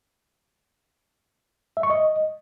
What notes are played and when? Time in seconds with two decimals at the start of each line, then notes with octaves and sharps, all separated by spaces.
1.77 E5
1.83 C#6
1.90 D#5